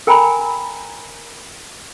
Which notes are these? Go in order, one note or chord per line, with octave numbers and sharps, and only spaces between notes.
A#4 G5 G#5 A#5 B5